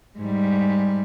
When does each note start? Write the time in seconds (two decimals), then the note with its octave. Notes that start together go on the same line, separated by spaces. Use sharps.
0.19 G#2 G3